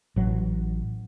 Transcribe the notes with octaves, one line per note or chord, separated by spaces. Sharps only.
A1 F#3